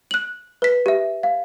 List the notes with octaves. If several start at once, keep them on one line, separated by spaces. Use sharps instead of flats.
F#6 F#7
B4 B6
G4 E5
F5